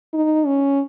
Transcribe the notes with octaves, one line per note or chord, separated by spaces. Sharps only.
D#4
C#4